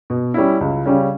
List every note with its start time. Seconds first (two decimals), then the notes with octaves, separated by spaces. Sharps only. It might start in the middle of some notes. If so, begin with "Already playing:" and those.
0.10 B2
0.34 G3 C#4 E4
0.61 C#2
0.86 C#3 G3 C#4